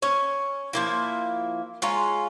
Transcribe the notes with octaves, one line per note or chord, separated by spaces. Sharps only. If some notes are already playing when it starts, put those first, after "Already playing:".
C#4 C#5
F3 A#3 E4
G#3 C#4 F4 A#5